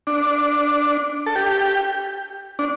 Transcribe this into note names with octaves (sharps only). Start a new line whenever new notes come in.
D4
A4
G4
D4